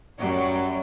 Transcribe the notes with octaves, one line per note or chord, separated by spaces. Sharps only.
F#2 F#3 G3